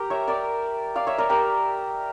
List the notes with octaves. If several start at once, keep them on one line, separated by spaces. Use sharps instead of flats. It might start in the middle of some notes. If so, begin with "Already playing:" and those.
Already playing: G4 A#4
C#5 E5
A#4 D5
D5 F5
C#5 E5
A#4 D5
G4 A#4